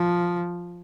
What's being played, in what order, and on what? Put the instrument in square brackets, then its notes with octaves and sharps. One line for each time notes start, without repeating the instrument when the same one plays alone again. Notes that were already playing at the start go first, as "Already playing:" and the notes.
Already playing: [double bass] F3